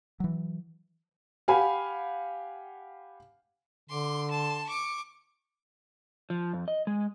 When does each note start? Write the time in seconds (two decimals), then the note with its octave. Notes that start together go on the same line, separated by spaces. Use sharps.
0.20 E3 F#3
1.48 G4 F5 F#5 G#5 B5
3.90 D3 C6 D6
4.31 A5 C6
4.67 C#6 D6
6.30 F3
6.53 F2
6.68 D#5
6.87 G#3